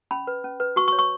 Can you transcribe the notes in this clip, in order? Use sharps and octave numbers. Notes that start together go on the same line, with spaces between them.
C#4 B5
B4
C#4
B4
F#4 C#6
C#6
C#5
C#6